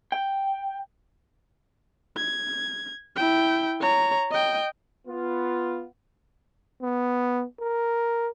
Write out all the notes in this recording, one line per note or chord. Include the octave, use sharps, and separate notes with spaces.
G5
G#6
E4 G5
C#5 A#5
D#5 G5
B3 F4
B3
A#4